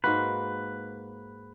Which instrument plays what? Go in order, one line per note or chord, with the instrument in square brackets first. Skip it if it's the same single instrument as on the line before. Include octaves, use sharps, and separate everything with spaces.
[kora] G#2 A#3 F#4 [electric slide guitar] B4